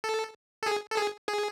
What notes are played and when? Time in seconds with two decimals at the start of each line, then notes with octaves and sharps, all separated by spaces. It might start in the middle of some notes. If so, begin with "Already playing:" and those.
0.04 A4
0.63 A4
0.66 G#4
0.90 A4
0.97 G#4
1.28 G#4